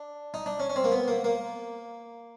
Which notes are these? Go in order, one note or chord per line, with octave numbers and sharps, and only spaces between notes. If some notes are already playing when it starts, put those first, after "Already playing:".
Already playing: D4
D#4
D4
C#4
C#4
C4
A#3
B3
A#3
A#3